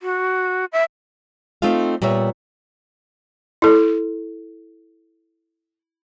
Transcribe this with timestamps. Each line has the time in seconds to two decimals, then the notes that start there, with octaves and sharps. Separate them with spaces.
0.01 F#4
0.72 E5
1.62 A3 C4 D#4 F4 F5
2.02 A#2 G3 B3 C#5 E5
3.62 E4 A4